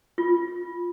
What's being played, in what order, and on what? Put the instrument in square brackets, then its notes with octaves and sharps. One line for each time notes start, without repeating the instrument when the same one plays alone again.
[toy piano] F4